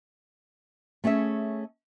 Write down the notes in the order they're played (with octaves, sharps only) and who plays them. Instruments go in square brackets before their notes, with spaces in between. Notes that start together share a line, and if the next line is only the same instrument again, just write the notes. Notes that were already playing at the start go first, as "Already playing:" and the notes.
[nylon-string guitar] A3 C#4 G#4 E5